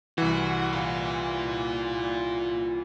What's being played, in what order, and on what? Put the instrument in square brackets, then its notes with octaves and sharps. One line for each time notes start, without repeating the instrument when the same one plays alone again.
[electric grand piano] C2 E3 [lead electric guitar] F#4
[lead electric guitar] F4 A#4